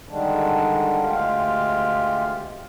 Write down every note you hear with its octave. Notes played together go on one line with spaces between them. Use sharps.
D3 D#3 G3 G#3 D4
D2 G#3 F4 G4 F5